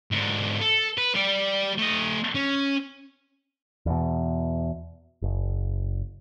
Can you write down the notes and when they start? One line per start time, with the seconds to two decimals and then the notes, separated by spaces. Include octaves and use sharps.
0.11 G#2 D3
0.61 A4
0.98 B4
1.15 G3 D5
1.79 A3 D#5
2.35 C#4
3.86 E2 B2
5.22 F#1